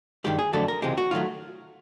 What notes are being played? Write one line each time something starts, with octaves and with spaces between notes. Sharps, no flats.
G2 D#3 G#3 G4
G#4
F2 D3 F#3 A3 A4
A#4
C#2 C3 E3 G#3 G4
F#4
D#3 F#3 A3 F4